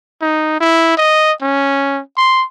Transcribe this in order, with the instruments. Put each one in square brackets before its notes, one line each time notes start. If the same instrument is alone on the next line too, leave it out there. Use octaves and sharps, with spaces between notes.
[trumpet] D#4
E4
D#5
C#4
C6